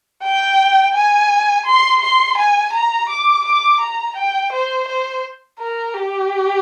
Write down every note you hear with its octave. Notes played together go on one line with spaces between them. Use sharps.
G5
G#5
C6
C6
G#5
A#5
D6
D6
A#5
G5
C5
C5
A#4
G4